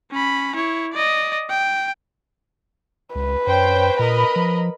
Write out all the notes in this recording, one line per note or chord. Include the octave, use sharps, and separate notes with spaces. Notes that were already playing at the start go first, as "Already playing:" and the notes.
C#4 B5
E4 C#5
D5 D#5
G5
C#2 B4
F#2 C5 C#5 G5
A#2 A#4 D#5 B5
F3